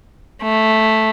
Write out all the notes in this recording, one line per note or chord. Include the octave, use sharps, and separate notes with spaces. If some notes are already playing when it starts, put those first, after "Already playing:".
A3